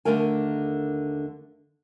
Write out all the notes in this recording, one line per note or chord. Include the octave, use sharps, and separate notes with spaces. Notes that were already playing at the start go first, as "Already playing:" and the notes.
D#2 D3 E3 A3 A#4 G#5